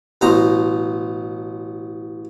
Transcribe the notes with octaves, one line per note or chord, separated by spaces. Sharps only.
A1 B2 C5 A#5